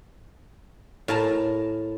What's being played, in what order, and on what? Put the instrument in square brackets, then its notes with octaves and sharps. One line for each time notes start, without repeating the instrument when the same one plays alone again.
[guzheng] A2 A#4 A5 A#5